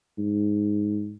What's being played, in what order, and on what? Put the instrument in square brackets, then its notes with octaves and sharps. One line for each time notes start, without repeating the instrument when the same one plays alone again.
[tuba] G#2